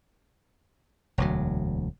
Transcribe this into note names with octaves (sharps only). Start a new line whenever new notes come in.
E1 D2 F#3